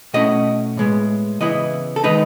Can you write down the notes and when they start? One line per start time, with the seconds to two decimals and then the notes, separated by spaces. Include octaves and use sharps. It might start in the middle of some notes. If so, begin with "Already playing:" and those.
0.14 B2 A3 C#4 E4 D#5
0.77 A2 G#3 B3
1.40 C#3 E3 B3 E4 D#5
1.96 A4
2.04 D#3 G#3 D#4 B4